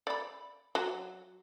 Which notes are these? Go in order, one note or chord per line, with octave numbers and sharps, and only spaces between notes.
D5 B5
F#3